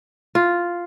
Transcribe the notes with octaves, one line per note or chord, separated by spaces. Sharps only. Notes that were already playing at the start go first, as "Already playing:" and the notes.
F4